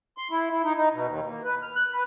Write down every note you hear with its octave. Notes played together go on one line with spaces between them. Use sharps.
C6
E4
E4
D#4
D#4
B2
D#2
A#3
B4
F6
F#6
B4